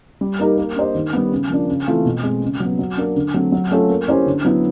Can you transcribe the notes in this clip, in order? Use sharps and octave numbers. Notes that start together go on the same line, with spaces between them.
G3
A#3 D#4 G4 A#4
A#3
D4 G4 C5 D#5
D#3
G3 B3
C#3
F3 A#3 D4
C#3
E3 A3 C4 F4
B2
G#3 C4
C#3
F#3 B3
F#3
A#3 D4
D3
F#3 A3 C4
F#3
A3 C#4 F4 A4
A#3
C#4 E4 G4 C5
D3
F#3 B3 E4